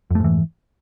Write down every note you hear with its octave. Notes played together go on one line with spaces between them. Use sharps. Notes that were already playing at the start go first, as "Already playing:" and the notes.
F2 G#2 E3 A3